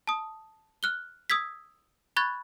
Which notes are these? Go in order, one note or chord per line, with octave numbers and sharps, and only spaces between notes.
A5 D#6
F6 F#6 G7
D#6 E6 G#6 B6
B5 C#6 F#6 G#6 A6